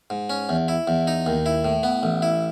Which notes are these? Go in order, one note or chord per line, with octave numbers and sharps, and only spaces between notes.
G#2
C#4
E2
E4
E2
D#4
D#2
E4
A2
B3
A1
E4